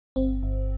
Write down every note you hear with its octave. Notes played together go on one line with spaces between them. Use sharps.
G1 C4
G1